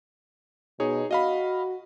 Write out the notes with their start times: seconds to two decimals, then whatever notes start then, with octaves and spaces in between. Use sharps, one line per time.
0.80 B2 D#4 G#4 C#5
1.11 F#4 D#5 F5 B5